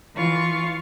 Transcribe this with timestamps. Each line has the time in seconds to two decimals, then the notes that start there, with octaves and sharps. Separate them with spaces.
0.14 E3 F4 C#6